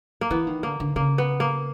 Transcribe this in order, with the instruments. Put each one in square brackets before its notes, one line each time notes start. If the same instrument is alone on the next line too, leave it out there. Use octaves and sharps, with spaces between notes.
[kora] A#3
[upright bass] E3 [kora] B3
[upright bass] D#3
[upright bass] D3 [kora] A#3
[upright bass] D3
[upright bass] C#3 [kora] A#3
[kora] B3
A#3